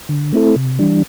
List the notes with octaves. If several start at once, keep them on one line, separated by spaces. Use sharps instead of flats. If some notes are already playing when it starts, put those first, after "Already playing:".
D3
A3 C4 E4 A4
C3
E3 G3 D4